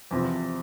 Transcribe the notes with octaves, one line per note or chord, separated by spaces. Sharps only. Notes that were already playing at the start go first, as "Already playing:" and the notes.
E2 C3 F3